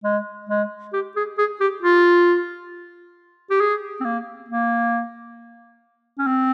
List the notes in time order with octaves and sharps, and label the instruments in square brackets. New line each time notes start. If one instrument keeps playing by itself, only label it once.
[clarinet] G#3
G#3
G4
G#4
G#4
G4
F4
G4
G#4
C4
A#3
A#3
C#4
C4